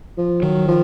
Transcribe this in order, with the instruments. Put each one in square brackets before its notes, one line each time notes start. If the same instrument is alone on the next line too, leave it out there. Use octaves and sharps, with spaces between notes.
[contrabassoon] F3
[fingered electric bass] D#3 [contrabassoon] F#3
[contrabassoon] F3